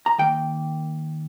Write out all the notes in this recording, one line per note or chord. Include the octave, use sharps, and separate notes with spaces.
A#5
D#3 A#3 G5